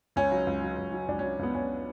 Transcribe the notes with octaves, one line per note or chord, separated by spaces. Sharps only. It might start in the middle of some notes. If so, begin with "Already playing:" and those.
C#2 C#4
F#3
C#2
F#3
C#2
F#3
C#2 D4
F#3 C#4
C#2 B3
C#2 C#4